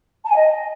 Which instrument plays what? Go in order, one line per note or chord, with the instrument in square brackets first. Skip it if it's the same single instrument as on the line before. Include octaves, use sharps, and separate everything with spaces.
[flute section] A5
G#5
D#5